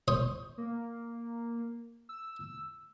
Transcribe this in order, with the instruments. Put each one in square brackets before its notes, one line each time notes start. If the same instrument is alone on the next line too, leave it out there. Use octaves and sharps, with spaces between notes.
[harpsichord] C5 C#5 D#6
[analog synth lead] A#3
E6